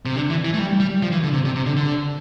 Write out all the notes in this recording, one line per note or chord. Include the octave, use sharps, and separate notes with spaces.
C3
D3
E3
E3
A3
G3
G3
F3
E3
D3
C3
C3
C3
D3
D3